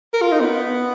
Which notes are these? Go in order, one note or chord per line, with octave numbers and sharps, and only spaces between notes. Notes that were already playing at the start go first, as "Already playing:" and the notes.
A#4
F4
D#4
B3